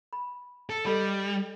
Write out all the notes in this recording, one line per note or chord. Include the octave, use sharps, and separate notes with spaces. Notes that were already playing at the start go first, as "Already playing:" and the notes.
B5
A4
G3 A4 D#5 B5